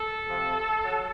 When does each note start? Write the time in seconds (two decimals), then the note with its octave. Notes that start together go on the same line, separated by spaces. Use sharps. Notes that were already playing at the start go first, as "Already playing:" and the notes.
Already playing: A4
0.26 C3 F3
0.82 F#3